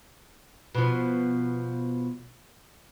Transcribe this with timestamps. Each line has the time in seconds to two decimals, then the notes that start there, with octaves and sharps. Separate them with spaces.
0.75 B2 F3